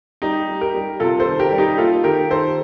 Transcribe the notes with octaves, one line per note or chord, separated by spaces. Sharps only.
G3 D#4 G4
G3
G4 A#4
G3
C3 F4 A4
A4 C5
D#3
G4 A#4
G3
D#4 G4
A#3 F4 A4
D#3 G4 A#4
D#3 A4 C5